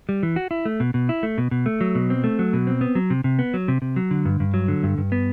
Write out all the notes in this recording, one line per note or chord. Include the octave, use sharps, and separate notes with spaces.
G3
E3
F#4
E4
A3
B2
B2
E4
A3
B2
B2
A3
F#3
B2
C4
A3
F#3
B2
C4
B3
F#3
C3
C3
B3
F#3
C3
C3
F#3
D3
G2
G2
F#3
D3
G2
G2
B3